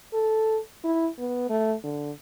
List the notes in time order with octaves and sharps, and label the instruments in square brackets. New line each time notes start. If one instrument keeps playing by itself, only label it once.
[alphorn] A4
E4
B3
A3
D3